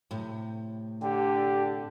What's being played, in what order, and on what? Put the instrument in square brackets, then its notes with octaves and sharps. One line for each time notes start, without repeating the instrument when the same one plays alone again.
[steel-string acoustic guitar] A2 C3
[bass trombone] D3 [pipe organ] G4